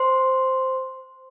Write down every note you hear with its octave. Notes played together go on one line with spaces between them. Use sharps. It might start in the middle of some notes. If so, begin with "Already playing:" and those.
Already playing: C5 C6